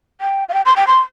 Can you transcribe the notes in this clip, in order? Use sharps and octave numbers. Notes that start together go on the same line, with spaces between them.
G5
F5
G5
C6
G5
C6